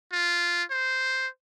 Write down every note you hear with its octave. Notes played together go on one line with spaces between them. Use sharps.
F4
C5